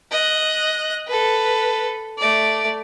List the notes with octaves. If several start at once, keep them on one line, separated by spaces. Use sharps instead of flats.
D#5 F#6
A4 B4
A3 D5